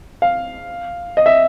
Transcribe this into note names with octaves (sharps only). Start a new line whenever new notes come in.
F5
D#5
E5